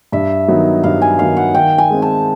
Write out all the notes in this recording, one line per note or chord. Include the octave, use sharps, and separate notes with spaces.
G2 E5
D#3 F#3 B3 D#4
G2 F5
G#5
D#3 F#3 B3 D#4 F5
F#5
D#3 G5
G#5
G#3 C4
A5